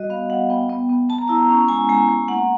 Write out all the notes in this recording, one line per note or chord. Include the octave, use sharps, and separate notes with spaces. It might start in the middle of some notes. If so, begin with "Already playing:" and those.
Already playing: G3 F#4 D#5
B3 F5
F#4 F#5
B3 G5
B3
B3
B3 A5
A#5
E4 A5
C#4 A#5
G#3 G#5
G#3 G#5
G#3
A#3 F#5